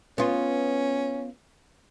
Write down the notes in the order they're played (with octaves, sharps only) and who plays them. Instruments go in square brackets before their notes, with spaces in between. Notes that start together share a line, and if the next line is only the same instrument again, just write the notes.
[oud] B3 F4 [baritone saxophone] C#4